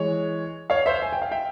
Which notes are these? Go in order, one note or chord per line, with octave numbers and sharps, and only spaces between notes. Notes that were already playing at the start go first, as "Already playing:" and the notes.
Already playing: E3 G#3 C#5
C#5 F5
C5 E5
G#5
G5
F5
E5 G5